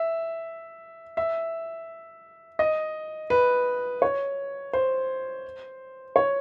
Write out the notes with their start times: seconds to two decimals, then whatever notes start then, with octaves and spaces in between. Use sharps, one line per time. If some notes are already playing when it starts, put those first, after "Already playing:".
Already playing: E5
1.17 E5
2.59 D#5
3.30 B4
4.02 C#5
4.73 C5
6.16 C#5